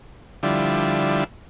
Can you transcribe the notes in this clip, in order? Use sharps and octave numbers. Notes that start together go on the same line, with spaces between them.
D3 F3 G3 E4